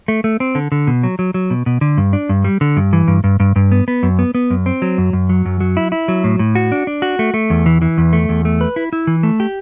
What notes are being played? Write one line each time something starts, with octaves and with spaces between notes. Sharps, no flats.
A3
A3
C4
D3
D3
B2
F#3
F#3
F#3
B2
B2
D3
G2
D4
G2
G3
D3
G2
E3
G2
G2
G2
G2
B3
B3
F#2
B3
B3
F#2
C4
F#3
F#2
F#2
F#3
F#2
F#3
E4
E4
F#3
A2
A2
F#4
D4
D4
F#4
A3
A3
E2
E3
E3
E2
A3
E2
A3
B4
E4
E4
E3
A3
G4